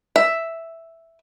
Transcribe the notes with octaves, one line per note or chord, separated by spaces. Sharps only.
E5